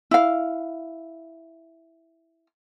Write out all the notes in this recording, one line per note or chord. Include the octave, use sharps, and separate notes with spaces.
E4 F5